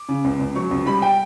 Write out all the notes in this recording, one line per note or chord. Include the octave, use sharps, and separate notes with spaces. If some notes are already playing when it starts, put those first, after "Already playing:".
Already playing: D6
C#3
C#2
C#2
F#3 C#6
C#2
G3 B5
G5